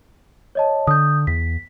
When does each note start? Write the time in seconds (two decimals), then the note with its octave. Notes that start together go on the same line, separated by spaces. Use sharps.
0.55 C#5 D#5 A5
0.87 D3 D#6 G6
1.27 E2 B6